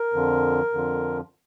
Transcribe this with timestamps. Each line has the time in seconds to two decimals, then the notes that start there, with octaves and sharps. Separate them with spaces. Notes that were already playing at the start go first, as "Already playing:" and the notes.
Already playing: A#4
0.13 F2 D3 F3
0.73 F2 D3 F3